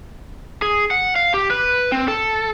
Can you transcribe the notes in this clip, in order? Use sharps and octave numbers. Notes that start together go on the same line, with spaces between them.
G#4
F#5
F5
G4
B4
C4
A4